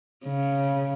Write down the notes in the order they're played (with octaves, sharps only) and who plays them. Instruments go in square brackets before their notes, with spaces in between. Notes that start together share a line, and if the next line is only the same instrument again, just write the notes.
[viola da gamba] C#3